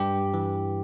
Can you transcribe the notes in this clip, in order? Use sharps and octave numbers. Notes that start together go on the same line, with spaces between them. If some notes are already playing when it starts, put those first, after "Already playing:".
Already playing: G2 G4
E3